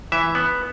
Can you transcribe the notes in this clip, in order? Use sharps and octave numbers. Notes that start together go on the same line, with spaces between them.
E3 E5
B3